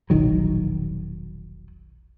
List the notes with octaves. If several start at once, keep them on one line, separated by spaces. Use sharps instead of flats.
E1 A#1 D#3 F#3